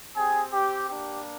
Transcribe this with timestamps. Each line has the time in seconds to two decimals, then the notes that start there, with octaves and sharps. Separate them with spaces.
0.16 C4 G4 G#4
0.52 G4
0.89 A#3 D4 G4